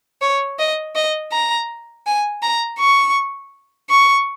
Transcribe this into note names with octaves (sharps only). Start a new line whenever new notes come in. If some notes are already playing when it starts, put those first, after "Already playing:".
C#5
D#5
D#5
A#5
G#5
A#5
C#6
C#6